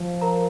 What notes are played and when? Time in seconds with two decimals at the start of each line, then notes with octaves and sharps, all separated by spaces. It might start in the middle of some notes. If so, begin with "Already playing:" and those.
Already playing: F3
0.21 A#4 A#5